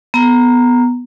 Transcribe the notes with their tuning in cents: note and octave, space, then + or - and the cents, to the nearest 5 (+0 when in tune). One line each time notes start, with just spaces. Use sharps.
B3 +0 A#5 -5